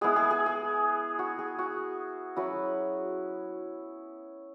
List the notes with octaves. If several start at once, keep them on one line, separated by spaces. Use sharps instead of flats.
G#3 B3 E4 G#4
G#4
G#4
G#4
F#4
G#4
F#4
F#3 C#4 E4 F#4 B4